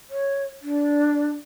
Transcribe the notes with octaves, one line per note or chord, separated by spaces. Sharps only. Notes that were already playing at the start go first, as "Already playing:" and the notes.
C#5
D4